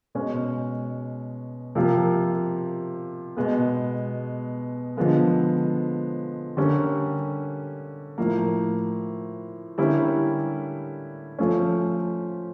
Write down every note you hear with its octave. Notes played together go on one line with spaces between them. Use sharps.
B2 G#3 C#4
C3 F3 A#3
B2 G#3 B3
D3 F3 G#3 B3
D3 G3 A#3 C#4
A2 F3 A#3
D3 G3 A#3 C#4 E4
F3 A3 C#4